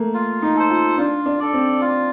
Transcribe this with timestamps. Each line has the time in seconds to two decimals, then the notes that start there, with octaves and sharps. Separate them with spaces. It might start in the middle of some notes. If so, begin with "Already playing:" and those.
Already playing: A3 A#3
0.14 F4
0.42 D#4
0.57 A4 C5
0.70 F4
0.98 D4 F4
1.26 D4
1.40 A4 D5
1.54 C4
1.81 F4